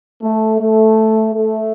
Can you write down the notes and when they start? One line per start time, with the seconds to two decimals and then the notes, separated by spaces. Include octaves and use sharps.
0.23 A3
0.61 A3
1.34 A3